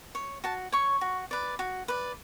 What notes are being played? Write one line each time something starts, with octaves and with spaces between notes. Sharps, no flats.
C#5
F#4 A5
C#5 C#6
F#4
B4 D5
F#4
B4 D5